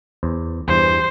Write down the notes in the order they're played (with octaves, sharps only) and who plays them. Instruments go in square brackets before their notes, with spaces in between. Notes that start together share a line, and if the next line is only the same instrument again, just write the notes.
[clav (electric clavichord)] E2 C5
[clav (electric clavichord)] E2 G2 E3 [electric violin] C5